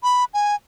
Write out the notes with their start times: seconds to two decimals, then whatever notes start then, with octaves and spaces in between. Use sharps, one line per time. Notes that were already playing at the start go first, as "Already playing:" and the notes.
0.04 B5
0.34 G#5